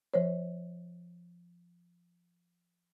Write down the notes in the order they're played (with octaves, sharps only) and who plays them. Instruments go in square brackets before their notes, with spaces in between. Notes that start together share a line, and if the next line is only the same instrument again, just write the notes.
[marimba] F3 C5 C#5